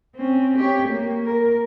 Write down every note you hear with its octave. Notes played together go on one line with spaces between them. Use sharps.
C4 C#4
G4 C#5
A#3
A#4